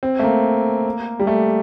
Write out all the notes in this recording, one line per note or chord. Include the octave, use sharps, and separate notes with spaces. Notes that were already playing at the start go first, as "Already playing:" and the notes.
C4
A3
A#3
G3
A3